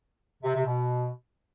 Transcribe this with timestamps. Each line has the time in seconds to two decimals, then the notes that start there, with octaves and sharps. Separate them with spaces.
0.43 C3
0.54 C3
0.65 B2